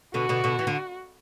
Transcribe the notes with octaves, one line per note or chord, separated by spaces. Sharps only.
B2 D3 F#4
B2 D3
B2 D3
E3
D3